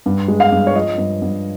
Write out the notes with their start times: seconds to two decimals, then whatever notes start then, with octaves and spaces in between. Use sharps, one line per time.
0.06 G2
0.28 G#3
0.40 F5
0.52 G2
0.67 C#5
0.74 F3 D#5
0.98 G2
1.22 G2